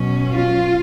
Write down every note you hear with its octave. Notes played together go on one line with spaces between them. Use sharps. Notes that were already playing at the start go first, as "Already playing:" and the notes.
Already playing: B2 F#3 C#4
F4